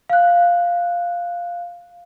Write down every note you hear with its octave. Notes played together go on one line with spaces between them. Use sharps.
F5 F#6